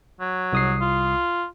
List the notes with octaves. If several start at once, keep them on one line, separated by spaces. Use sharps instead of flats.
F#3
C2 D#6 C7
F4